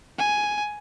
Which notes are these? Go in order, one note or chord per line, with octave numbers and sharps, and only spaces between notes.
G#5